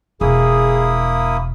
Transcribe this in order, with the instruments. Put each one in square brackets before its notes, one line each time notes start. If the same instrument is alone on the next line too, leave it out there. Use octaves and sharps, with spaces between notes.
[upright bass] E1 [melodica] A#3 E4 D#6 [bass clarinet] G#4